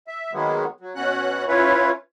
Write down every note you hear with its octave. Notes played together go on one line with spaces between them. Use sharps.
E5
D#3 F#3 G#3 A#3 B3
F#3
B2 C#4 F#4 F#5 F#6
C#4 E4 F4 B4 C#5